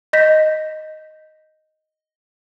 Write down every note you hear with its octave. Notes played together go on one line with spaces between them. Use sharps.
D#5 G6 A#6 B6